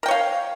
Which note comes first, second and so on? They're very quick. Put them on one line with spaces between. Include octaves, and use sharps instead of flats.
A#4 G5 C#5 F5